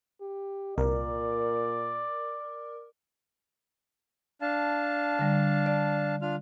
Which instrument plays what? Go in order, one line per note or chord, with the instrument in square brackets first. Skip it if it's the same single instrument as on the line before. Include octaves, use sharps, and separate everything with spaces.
[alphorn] G4
[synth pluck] C2 [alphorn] A#2 [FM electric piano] A#4 [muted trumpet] D5
[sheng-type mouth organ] D4 F5 A5
[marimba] D3 G3
D5
[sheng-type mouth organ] D4 F4 F6